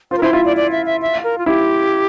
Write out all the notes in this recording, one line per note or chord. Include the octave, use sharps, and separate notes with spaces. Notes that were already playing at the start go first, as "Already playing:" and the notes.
F4 C5
A#4
E4 C5
F4 E5
D5
D5
E5
E5
E5
A#4
F4
E4 G4